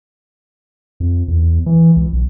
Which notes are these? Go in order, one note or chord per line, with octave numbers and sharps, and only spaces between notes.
F2
E2
E3
C#2
B1